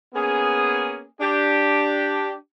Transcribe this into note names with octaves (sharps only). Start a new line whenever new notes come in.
A#3 B3 C#4 G#4
D4 G4